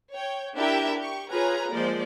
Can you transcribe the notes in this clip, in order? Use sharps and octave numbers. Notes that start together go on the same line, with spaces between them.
C#5 G5
D4 E4 G4 A#4 E5
G4 C#6
F4 G#4 B4 C#5 G#5 A#5
F3 G#3 A#3 C5 D5